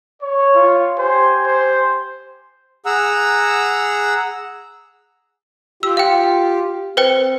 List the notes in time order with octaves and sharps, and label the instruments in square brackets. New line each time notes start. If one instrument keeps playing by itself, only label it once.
[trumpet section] C#5
[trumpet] F4
[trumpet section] G4 G#5 [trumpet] C5
[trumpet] C5
[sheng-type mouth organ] G#4 F#5 A#5 E6
[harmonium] F4 G4 [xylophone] E6
[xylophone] F5 G5
[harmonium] C4 [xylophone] B4 C5 G5